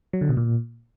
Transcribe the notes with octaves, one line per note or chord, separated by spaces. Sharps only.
F#3
D3
B2
A#2